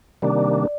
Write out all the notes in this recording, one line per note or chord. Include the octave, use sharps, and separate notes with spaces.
C3 D#3 G3 A#3 D4 D5